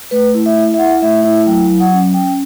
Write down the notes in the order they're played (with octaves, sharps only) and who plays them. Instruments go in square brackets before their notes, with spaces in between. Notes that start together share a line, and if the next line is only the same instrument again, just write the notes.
[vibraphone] A3 B4
E4
E5
E4
E5
E4 F#5
A3 E5
E4 E5
F#3 G5
F#3
F#5
C#4
C#4 G5